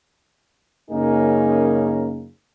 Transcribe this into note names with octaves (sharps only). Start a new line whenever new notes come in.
F#2 C#3 A#3 D#4 G#4 A#4